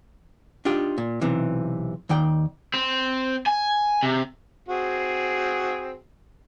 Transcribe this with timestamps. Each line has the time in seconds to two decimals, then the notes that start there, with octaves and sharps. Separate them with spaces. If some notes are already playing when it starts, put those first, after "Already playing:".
0.65 D4 D#4 F4 G4
0.98 A#2
1.21 B1 C3 E3
2.09 D#2 D#3 D5 G5
2.74 C4
3.46 G#5
4.03 C3
4.68 C4 F#4 G#4